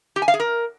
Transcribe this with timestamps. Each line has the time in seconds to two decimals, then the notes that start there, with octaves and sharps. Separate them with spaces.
0.16 G4
0.22 G#5
0.28 F5
0.34 G#4
0.40 A#4